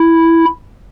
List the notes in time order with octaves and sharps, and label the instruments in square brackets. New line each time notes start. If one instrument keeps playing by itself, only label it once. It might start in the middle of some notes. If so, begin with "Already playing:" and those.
Already playing: [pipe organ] E4